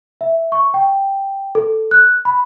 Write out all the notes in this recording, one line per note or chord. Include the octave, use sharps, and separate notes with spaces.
E5
C#6
G5
A4
F#6
B5